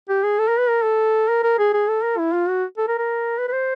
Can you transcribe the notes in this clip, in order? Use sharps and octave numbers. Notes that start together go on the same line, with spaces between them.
G4
G#4
A4
A#4
B4
A#4
A4
A#4
A#4
G#4
G#4
A4
A#4
E4
F4
F#4
A4
A#4
A#4
B4
B4
C5